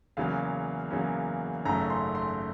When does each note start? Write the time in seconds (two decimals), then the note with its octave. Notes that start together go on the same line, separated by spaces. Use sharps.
0.17 E2 C#3 F#3 A#3 F5
0.91 E2 C#3 F#3 A#3
1.65 G#1 F#2 C#3 F#3 A3 A#5
1.90 C6
2.15 C6